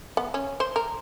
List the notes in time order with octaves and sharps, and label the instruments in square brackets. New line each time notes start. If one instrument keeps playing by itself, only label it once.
[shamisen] B3
C#4
C5
A#4